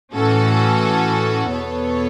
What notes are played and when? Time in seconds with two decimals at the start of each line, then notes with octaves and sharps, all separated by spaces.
0.14 A2 E3 C#4 F#4 A4
1.52 E2 B2 B3 A4 C#5